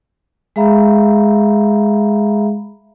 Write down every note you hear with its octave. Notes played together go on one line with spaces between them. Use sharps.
G#3 G#4 E5 F5 A#5 B5